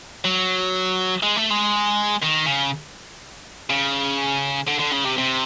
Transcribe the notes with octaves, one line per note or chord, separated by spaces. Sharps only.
F#3
G#3
A3
G#3
D#3
C#3
C#3
D3
D3
C#3
C3
C3